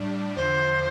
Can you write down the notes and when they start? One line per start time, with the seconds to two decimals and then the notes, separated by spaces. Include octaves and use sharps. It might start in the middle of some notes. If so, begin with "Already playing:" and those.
Already playing: A2 G3 D4
0.36 E2 D3 F3 C5